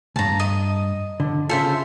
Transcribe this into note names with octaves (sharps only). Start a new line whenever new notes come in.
C#2 G2 A5 A#5
D#5
D3
C#3 F4 A4 C5 E5